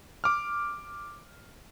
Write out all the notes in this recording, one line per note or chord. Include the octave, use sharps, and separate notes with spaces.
D6 F6